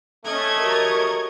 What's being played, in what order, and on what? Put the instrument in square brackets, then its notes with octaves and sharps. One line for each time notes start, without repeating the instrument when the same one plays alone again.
[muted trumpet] A3 [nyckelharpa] C#4 A4 [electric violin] D#5 G#6
[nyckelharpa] F#4 G4 [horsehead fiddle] A#4 C#5